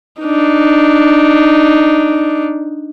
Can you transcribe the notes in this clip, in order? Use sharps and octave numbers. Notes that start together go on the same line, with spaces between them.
D4 D#4